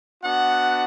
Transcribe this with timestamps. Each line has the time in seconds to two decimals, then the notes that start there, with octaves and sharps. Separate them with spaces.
0.22 B3 D4 F#4 F#5